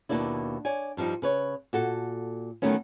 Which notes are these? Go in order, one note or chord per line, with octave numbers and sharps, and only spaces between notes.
D#2 B2 A#3 D4 E4
C#5 D5 G#5
G2 F3 G3 D#4
C#3 B4 C#5
A#2 F#4 A4
D#3 E3 F#3 A3 B3 C#4